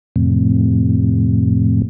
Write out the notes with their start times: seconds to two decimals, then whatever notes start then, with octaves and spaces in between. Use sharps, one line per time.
0.16 F2 A2 C3